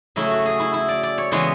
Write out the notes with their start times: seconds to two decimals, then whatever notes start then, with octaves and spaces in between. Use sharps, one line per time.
0.16 C#3 F#3 A3 C#4 E4
0.31 F#4
0.46 G#4
0.60 E4
0.73 E4
0.88 D5
1.03 D5
1.18 C#5
1.31 C#3 E3 G#3 B3 C#5